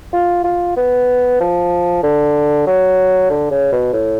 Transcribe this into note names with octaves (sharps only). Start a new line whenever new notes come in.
F4
F4
B3
F3
D3
F#3
D3
C#3
B2
A2